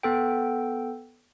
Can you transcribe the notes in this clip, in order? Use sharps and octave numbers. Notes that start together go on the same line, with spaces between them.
B3 A4 G5